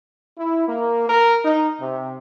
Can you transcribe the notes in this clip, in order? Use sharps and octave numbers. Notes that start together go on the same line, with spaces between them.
E4
A#3
A#4
D#4
C3